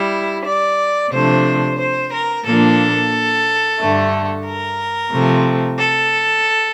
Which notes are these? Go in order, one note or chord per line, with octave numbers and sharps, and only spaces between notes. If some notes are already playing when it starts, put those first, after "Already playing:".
Already playing: G3 E4
D5
C3 F3 A3 D4 C5
C5
A#4
A#2 F3 A#3 D4 A4
G2 D3 A3
A#4
C3 F3 A3 C4
A4